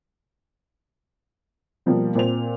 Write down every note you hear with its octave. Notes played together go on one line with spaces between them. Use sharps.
B2 F3 G3 A#3
A#2 C4 C5 F7